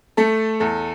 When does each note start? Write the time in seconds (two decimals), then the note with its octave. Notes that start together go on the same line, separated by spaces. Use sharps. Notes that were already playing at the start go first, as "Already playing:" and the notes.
0.17 A3 A4
0.60 E2 A4